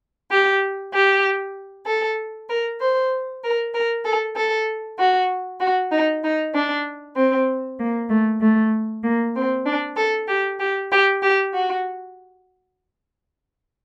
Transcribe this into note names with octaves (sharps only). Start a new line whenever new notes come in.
G4
G4
A4
A#4
C5
A#4
A#4
A4
A4
F#4
F#4
D#4
D#4
D4
C4
A#3
A3
A3
A#3
C4
D4
A4
G4
G4
G4
G4
F#4